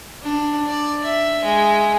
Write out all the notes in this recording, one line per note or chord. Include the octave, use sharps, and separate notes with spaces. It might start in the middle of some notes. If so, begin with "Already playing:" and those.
D4
D5
E5
G#3